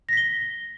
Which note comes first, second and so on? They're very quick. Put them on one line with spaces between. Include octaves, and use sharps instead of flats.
A#6 B6 G7